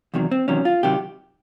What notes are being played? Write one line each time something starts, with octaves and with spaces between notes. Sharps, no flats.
E2 C3 D#3 F#3
C4
E2 C3 D#3 F#3 C#4
F4
C3 D#3 F#3 G4